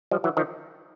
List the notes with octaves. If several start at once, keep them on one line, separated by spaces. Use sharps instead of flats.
F3 G3
E3 F#3
D#3 F3